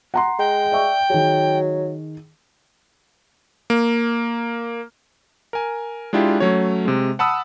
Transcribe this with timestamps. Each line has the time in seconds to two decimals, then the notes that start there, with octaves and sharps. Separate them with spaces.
0.14 F#5 A#5 C6
0.39 G#3 G5
0.72 D5 E5 C#6
1.10 D#3 F#3 G#4
3.70 A#3
5.53 A#4 G#5
6.13 G#3 D4 E4 F4 G4
6.40 F#3 A3 C#4 C#5
6.85 C3 G#3
7.19 F#5 A5 B5 D#6 E6